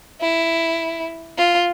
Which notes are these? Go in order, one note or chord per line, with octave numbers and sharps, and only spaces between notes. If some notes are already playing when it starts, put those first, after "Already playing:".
E4
F4